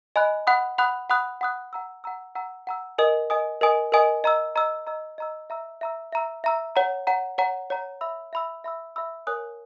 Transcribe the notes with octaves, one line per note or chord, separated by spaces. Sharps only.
D#5 G#5 B5 F#6
F#5 B5 D#6 F#6
F#5 B5 D#6 F#6
F#5 B5 D#6 F#6
F#5 B5 D#6 F#6
F#5 A#5 E6
F#5 A#5 E6
F#5 A#5 E6
F#5 A#5 E6
A#4 D#5 G#5 D#6
A#4 D#5 G#5 D#6
A#4 D#5 G#5 D#6
A#4 D#5 G#5 D#6
D#5 A#5 E6
D#5 A#5 E6
D#5 A#5 E6
D#5 A#5 E6
E5 A#5 E6
E5 A#5 E6
E5 A#5 E6
E5 A#5 E6
C#5 F#5 A#5
C#5 F#5 A#5
C#5 F#5 A#5
C#5 F#5 A#5
E5 B5 E6
E5 B5 E6
E5 B5 E6
E5 B5 E6
A#4 C#5 G#5 D#6 F#6